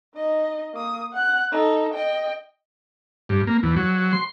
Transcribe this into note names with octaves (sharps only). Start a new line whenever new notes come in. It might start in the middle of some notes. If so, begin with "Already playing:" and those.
D#4 D#5
A#3 D#6
F#5 F#6
D#4 A4
D#5 G5
G2
A#3
E2
F#3
C6